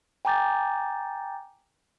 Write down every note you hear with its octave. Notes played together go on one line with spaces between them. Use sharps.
G5 G#5 A#5 D6 G6 A6